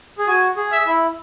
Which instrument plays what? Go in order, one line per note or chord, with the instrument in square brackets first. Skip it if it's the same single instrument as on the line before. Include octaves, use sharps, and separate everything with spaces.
[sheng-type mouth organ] G#4
[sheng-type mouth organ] F#4 [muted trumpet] G#5
[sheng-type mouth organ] G#4
[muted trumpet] E5
[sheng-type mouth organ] E4